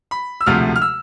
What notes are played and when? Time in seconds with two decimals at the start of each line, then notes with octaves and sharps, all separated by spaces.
0.11 B5
0.41 E6
0.46 E1 D2 C3 F3 A3 F6
0.76 F6
0.82 E6